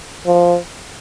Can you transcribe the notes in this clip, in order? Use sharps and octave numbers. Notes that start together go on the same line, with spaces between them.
F3